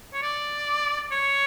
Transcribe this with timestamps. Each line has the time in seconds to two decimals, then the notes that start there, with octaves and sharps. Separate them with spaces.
0.14 C#5
0.22 D5
1.11 C#5